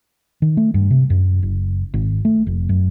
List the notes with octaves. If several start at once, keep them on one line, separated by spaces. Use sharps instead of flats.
D#3
A3
G2
C3
F#2
F#1
G#1
A3
F1
F#2